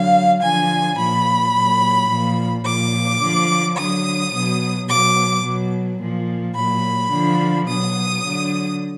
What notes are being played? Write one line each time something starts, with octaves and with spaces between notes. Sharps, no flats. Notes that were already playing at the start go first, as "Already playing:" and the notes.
Already playing: D3 F#3 F5
D3 F3 G#5
A#2 F3 B5
A#2 F#3
A#2 F3
A#2 F3 D6
D3 F3
D3 F#3 D#6
B2 F#3
B2 F#3 D6
B2 F#3
A#2 F3
A#2 F#3 B5
D3 F3
B2 F#3 D#6
D3 F#3